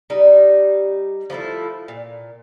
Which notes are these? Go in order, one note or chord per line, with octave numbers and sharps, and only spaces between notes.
G3 D#4
F3 A3 D#4 E4
A#2